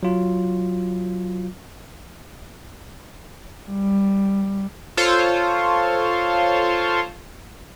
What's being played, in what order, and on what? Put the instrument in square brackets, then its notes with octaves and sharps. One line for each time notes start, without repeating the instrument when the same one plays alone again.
[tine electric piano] F#3 F4
[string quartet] G3
[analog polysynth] F4 A4 C5 C#5